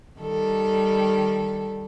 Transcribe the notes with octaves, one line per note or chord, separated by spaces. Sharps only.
D#3 G3 A4